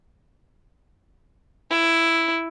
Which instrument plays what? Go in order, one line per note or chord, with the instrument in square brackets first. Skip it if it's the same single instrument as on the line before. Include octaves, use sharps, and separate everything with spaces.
[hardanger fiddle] E4